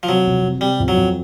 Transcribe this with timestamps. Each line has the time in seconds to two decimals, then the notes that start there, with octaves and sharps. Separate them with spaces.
0.03 F3
0.09 C3 F#3
0.26 F1
0.44 C3
0.61 C3 G3
0.80 F2
0.88 F#3
0.97 F2